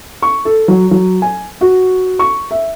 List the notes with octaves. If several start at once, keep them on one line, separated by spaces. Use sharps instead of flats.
C#6
A4
F#3
F#3
G#5
F#4
C#6
E5